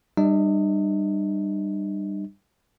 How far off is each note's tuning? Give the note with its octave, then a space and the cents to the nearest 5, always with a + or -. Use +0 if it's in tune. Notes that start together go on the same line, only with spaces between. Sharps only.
G3 +5 D4 +45 D#5 +40